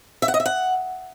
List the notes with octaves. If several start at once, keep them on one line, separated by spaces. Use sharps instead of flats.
E5
F#5
D#5
E5
F#5